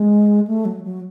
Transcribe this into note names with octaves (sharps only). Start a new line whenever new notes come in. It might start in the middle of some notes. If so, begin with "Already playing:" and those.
Already playing: G#3
A3
F#3
F#3